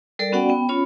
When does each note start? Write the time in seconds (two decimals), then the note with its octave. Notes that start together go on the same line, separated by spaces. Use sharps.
0.19 G3 A4 A#4 D5
0.32 B3 C#4 F#4 D5 F#5 G5
0.49 B3 G5
0.69 C#4 F4 C#5 B5